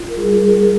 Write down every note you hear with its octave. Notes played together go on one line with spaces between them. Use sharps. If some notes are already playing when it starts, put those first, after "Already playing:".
Already playing: F4
A#4
G3 G#4
A#4
F4 G#4